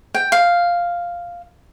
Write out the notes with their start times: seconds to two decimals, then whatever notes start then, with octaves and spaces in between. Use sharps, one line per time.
0.14 G5
0.32 F5